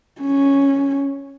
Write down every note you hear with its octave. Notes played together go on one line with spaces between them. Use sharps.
C#4